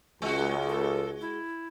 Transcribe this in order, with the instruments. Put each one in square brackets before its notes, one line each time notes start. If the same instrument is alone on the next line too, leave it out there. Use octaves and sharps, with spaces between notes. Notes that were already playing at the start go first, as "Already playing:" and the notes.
[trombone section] C#2 [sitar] G#3 F#4
[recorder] A4
E4